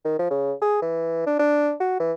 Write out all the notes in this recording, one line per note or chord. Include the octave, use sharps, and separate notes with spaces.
D#3
F3
C#3
G#4
E3
D4
D4
F#4
E3